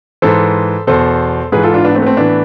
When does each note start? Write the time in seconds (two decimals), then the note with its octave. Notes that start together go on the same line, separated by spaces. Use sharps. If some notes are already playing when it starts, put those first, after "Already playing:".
0.22 G#2 E3 A4 C5
0.87 E2 B2 A4 C5
1.52 G#2 E3 G#4 B4
1.63 F4 A4
1.74 D4 F4
1.85 B3 D4
1.95 A3 C4
2.02 B3
2.06 A3 C4
2.17 A2 E3 B3 D4